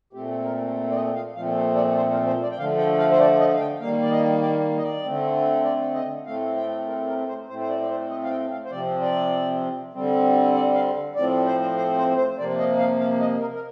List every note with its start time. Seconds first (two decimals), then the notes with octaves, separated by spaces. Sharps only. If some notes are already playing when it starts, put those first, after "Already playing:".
0.13 A#2 A3 C4 G4
0.44 A#4
0.90 D5
0.95 D#5
1.14 F5
1.35 A#2 F3 A3 C4 F5
1.76 D5
1.97 C5
2.13 A#4
2.27 C5
2.43 D5
2.51 G5
2.57 D3 F3 A3 F5
2.78 G5
2.98 F5
3.11 C5
3.19 D5
3.39 D#5
3.54 F5
3.60 G5
3.80 D#3 G3 A#3 F5
4.03 D5
4.11 D#5
4.41 D5
4.77 D#5
4.82 D5
5.03 D3 A3 C4
5.64 D5
5.94 D#5
6.26 A2 A3 C4 F5
6.56 G5
6.87 A#4
7.08 A#4
7.28 C5
7.48 A2 A3 C4 C5
7.61 C5
7.69 D5
7.82 D5
7.89 C5
8.10 D#5
8.23 F5
8.30 G5
8.50 F5
8.65 C5
8.71 C3 F3 C4 D5
9.02 D5
9.93 D3 G3 C4
10.54 D5
10.74 F5
11.15 A2 F3 C4 D5
11.47 C5
11.77 C5
11.97 C5
12.17 C5
12.38 C3 F3 A#3 D5
12.58 D#5
12.79 F5
13.00 F5
13.20 D#5
13.40 A#4
13.53 A#4